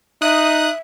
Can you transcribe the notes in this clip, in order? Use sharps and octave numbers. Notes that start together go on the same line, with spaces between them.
D#4 E5 D#6 F#6